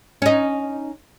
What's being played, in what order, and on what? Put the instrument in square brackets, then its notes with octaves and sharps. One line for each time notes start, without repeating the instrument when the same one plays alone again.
[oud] C#4 D#4